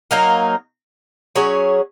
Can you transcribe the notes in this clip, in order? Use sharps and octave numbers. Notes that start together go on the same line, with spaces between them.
F#3 A#3 D#4 A#4
F#3 C#4 G#4 C#5